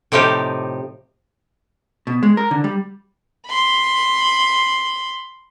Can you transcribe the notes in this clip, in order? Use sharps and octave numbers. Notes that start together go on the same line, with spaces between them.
A2 C3 F3 D#4 G4
B2
G#3
A#4
D3
G3
B5 C6